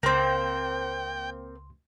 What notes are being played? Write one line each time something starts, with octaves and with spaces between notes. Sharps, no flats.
C#2 A#3 C4 G5 C6